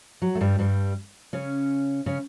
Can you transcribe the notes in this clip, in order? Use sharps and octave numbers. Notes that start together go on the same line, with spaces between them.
F#3
A3
G2 G3
G2 G3
C#3 C#4
C#3 C#4